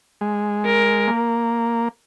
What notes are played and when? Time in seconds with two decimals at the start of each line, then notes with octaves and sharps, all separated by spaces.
0.21 G#3
0.65 A#4
1.08 A#3